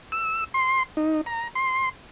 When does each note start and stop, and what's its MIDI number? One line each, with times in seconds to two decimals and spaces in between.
0.12 0.44 88
0.54 0.83 84
0.97 1.21 63
1.26 1.48 82
1.55 1.89 84